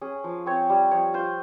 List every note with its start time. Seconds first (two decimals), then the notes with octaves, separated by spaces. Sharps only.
0.01 C#4 G#4
0.24 F3
0.46 C4 C#5
0.70 G3
0.91 F3 C#5
1.14 F4 C5